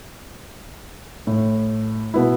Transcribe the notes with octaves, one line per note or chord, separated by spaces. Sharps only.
A2
B2 B3 E4